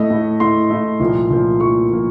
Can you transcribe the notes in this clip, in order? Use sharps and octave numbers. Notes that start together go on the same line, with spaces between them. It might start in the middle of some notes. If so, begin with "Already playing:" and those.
Already playing: A2 A3 D#5
A2 A3
A2 A3 C6
A2 A3
C2 A#2 F3 A#3
C2 A#2 F3 A#3
C2 A#2 F3 A#3 C#6
A#2 F3 A#3